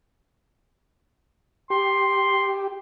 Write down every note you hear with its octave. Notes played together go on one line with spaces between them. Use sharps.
G4 C6